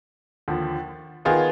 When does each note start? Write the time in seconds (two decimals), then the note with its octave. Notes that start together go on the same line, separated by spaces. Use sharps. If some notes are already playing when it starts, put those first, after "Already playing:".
0.48 D#2 D3 F3
1.25 D#3 B3 F4 G#4